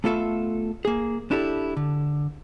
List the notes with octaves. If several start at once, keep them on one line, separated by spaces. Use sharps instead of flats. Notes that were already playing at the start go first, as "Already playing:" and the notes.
A3 B3 F4 A4 E5 F5
A#3 G#4
D4 E4 G4 A4
D3